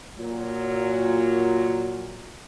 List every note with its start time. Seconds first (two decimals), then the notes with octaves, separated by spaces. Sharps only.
0.17 A#2 F#3